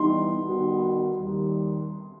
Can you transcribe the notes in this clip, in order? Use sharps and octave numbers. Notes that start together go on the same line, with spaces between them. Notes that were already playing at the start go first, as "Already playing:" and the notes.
Already playing: E3 G3 B3 D#4 C6
D#3 G3 B3 F#4
D#2 D#3 G3